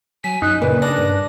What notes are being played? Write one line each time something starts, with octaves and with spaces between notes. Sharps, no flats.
F#3 G#5 B6
F#2 D#4 F#6
A#2 C#3 E3 B4
D4 A#6
G2